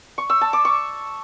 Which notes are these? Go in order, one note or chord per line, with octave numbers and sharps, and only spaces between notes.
C#6
E6
A5
D6
C#6